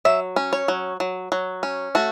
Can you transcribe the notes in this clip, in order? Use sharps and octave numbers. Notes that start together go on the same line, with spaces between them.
F#3 E5
C#4
C#5
F#3
F#3
F#3
C#4
A3 F#4